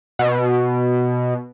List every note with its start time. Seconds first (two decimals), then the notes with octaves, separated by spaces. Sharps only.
0.19 B2